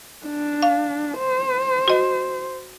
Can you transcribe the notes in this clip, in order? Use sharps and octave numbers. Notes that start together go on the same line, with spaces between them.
D4
F5
C5
F#4 D#5